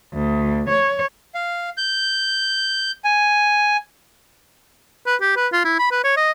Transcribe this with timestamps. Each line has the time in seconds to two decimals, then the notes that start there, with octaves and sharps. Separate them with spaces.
0.12 D2
0.68 C#5
1.35 F5
1.77 G6
3.04 G#5
5.07 B4
5.21 G4
5.36 B4
5.53 F4
5.64 E4
5.79 B5
5.91 B4
6.04 C#5
6.17 D#5